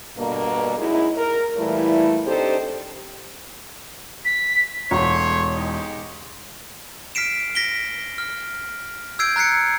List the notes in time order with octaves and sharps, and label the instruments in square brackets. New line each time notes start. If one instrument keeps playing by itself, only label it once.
[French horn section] G2 B2 D3 A#3
F#2 G#3 D#4 E4
A#4
A#2 E3 G3 A3 E4
C4 D4 D#4 G4 A4 C5
[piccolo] B6
[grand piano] E1 [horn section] A3 C5 C#5
[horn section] G#3 D#4 G4
[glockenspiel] F6 B6 C7 D7 E7
A#6 B6 D7 G7
F6
E6 G6 G#6 C7 D7
A#5 F#6 G#6 C7 C#7